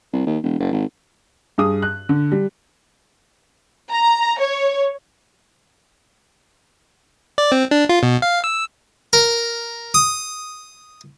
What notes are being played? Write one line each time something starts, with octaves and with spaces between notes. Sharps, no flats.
C2
D#2
E1
F#1
G#1
G2 G#4 D#6
F#6
D3
G3
A#5
C#5
D5
C4
D4
F4
B2
F5
E6
A#4
D#6